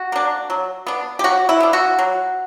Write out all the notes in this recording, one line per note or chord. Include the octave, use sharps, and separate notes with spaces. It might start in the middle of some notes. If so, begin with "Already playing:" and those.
Already playing: F#4
A#3 D4
F#3
B3 D4
G4
F#3 F#4
E4
B3 D4
F#4
F#3